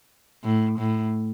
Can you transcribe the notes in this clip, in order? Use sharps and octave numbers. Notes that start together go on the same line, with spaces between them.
A2
A2